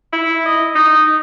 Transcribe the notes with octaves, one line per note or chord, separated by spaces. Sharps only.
E4
D#5
D#4